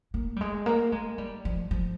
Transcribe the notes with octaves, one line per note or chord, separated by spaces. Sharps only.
A#3
G3
G#3
A#3
G#3
G3
F3
F3